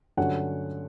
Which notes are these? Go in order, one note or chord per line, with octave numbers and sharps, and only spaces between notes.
G2 D3 F#3 A3 C#4 F#5